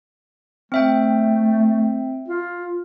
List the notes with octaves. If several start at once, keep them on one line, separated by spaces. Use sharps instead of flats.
A3 C4 E5 G5
F4